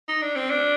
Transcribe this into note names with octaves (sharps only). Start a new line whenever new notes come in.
D#4
D4
C4
D4